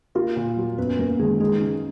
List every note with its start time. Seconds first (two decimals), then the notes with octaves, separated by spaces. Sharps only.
0.15 A#3 F4 A#4
0.36 A#2
0.57 F#3
0.78 F#2 B3 B4
0.98 F#2 A#3 A#4
1.19 D#3 G#3 G#4
1.40 G#3 D#4 G#4
1.61 C#3